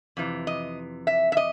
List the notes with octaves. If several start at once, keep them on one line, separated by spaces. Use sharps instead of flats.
F2 C3 E3
D#5
E5
E5
D#5